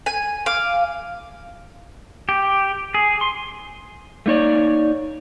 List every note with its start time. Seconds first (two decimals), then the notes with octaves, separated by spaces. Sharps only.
0.06 G#5
0.46 F5 D6
2.29 G4
2.94 G#4
3.21 C6
4.26 A3 A#3 D#4 C#5 D5